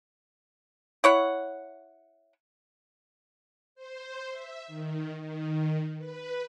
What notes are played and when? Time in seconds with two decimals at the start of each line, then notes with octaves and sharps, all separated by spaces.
1.04 E4 C#5 F#5
3.75 C5
4.30 E5
4.67 D#3
5.21 D#3
5.98 B4